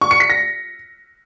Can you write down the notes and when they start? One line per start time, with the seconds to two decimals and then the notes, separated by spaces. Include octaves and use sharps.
0.01 C#6
0.11 C#7
0.20 B6
0.30 A#6